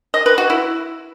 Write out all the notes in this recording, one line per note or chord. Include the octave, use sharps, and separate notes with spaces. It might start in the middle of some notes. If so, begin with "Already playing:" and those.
D#5
B4
F#4
E4